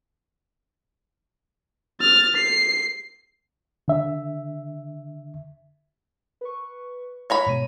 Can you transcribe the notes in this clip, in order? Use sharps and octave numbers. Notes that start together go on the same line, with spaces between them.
F6 A6
C7
D3 E5
B4 C#6
C#5 A#5 B5
G#2 B2 D#7